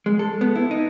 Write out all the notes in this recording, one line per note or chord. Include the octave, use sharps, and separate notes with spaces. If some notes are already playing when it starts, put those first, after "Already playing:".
G#3
A4
B3
E4
D#4